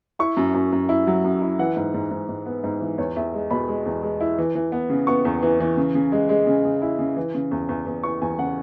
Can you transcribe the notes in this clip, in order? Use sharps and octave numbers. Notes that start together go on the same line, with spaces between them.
E4 C#6
F#2
F#2
F#2
E4
F#3
F#2
E4
E3 F#5
G#2
G#2
G#2
G#2
B3
G#2
E3
E2 C#5
E2 E5
G#3
B2 B5
G#3
E2
G#3
E4
E3
E3
B3
C#3
B3 C#6
E2
E3
E3
C#3
C#3
G#3
G#3
C#3
C#3
E4
C#3
E3
C#3
E2
E2
E2
E3 C#6
E2 G#5
C#3 F#5